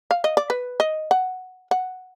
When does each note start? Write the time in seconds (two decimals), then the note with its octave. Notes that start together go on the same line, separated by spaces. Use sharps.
0.11 F5
0.24 D#5
0.37 D5
0.50 B4
0.80 D#5
1.11 F#5
1.71 F#5